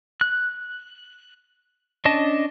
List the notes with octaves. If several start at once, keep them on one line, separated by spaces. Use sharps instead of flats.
F#6
C#4 D4 D#5 A5